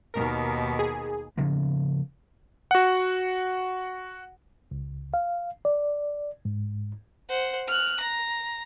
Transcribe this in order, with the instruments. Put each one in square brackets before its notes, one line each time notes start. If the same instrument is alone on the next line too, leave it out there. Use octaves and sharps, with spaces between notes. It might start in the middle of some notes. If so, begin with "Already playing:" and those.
[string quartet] D#2 B2 D#3 [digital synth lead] A#4
[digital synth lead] G#4
[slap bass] C#3 F3 A#3 B3
[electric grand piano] F#4 F#5
[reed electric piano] C#2
F5
D5
G#2
[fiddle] C5 F#5
F6 F#6
A#5